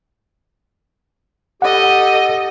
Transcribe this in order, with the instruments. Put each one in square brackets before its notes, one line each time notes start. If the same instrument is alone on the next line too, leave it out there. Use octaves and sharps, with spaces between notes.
[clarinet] G4 [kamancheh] A4 D#5 [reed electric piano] F#5